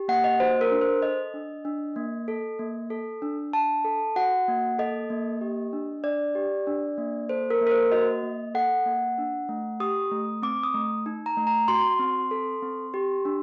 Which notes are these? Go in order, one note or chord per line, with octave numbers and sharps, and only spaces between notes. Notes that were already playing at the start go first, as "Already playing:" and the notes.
Already playing: G4
A#3 F#5
D#5
F#4 C5
A#4
D4
C5
A4 D#5
D4
D4
A#3
A4
A#3
A4
D4
D4 A5
A4
F#4 F#5
A#3
A4 D#5
A#3
G4
D4
D4 D5
G4
D4
A#3
A4 C5
A#4
A#3
A#4
C5
F#4 D#5
A#3
A4 F#5
A#3
D4
A3
G4 D#6
A3
C4 D6
D#6
A3
D#4
A#5
A3
A#5
F#4 C6
C4
A4
C4
G4
D4